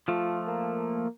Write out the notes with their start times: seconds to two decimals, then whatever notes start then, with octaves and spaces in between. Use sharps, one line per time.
0.08 F3 A3 F4
0.47 A#3